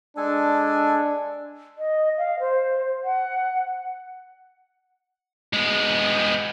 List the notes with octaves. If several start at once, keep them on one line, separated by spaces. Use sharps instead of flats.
G#3 D4 A4 G#5
D#5
F5
C5
F#5
G#3 B3